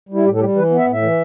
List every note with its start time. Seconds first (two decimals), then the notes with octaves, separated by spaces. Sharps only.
0.09 G3
0.14 E4
0.25 A2 G4
0.35 A4
0.40 G3 G4
0.56 E3 B4
0.70 B3
0.78 E5
0.86 A2
0.93 E5
1.02 E3